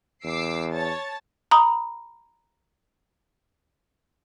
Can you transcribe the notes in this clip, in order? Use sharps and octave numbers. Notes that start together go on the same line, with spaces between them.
E2 D6 E6 C7
C#5 A5 A6
A#5 B5 D#6